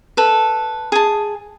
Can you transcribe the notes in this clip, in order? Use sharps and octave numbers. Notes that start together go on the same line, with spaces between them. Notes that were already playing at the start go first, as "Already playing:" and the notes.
A4 B4
G#4 A5